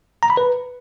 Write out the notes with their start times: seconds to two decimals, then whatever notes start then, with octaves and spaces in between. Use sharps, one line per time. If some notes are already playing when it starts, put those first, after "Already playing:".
0.23 A#5
0.30 B5
0.37 B4